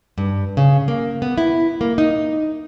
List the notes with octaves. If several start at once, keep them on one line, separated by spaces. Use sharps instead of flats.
G2
C#3
A#3
B3
E4
A#3
D#4